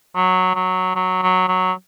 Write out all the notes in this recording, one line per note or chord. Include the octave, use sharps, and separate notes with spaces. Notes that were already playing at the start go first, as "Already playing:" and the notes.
F#3
F#3
F#3
F#3
F#3